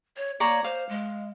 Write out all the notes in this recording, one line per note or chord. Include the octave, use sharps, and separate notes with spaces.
C#5
A#3 C#5 D5 A#5
C5 F5
G#3